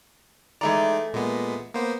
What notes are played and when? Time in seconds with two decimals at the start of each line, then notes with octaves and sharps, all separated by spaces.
0.61 E3 G#3 A3 D#4 D5 A#5
1.13 A#2 G#3 B3
1.74 A#3 B3 C5